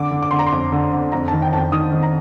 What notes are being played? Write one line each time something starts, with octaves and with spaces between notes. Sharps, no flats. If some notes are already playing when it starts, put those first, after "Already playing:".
Already playing: D3 D6
D3
D6
D3 C6
A#5
C6
F2
D3
D3
F2 A#5
D#3 A5
G5
F2 A5
G5
D#3 D#6
D#3
A#5